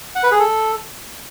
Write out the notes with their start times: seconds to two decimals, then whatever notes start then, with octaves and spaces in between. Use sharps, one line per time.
0.15 F#5
0.23 B4
0.31 G#4
0.40 A4